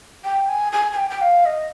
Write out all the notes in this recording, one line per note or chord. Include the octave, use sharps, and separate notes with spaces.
G5
G#5
G#5
G#5
G5
G5
F5
D#5